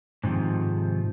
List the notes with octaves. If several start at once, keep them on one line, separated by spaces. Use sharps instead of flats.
G#2 C3 D#3 F3